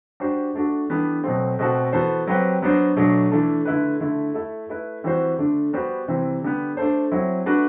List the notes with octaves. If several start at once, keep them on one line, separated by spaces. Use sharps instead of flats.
G3 D4 F#4 C5
A3 D4 F#4 A4
E3 G3 B3 D4 A4
B2 F#3 A3 C4
B2 A3 C4 F#4 A4
E3 B3 F#4 A4 C5
F#3 C4 G4 B4
F#3 B3 D4 F#4 C5
B2 F#3 A3 D4
E3 A3 D4 A4
D3 A3 E4 B4
D3 A3 E4
A3 E4 A4
A3 E4 B4
E3 G3 C4 F#4 C5
D3 A3 D4
G3 B3 F#4 C5
C3 E3 G3 C4
D3 G3 B3
A3 D4 A4 C5
F#3 C4 E4
A3 D4 F#4 B4